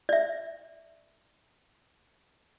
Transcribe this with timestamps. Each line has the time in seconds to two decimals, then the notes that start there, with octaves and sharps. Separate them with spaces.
0.09 D5 E5